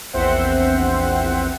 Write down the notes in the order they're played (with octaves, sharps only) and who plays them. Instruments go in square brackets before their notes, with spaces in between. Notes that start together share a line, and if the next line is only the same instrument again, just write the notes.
[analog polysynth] A#1 E2 C4 C5 E5 F#5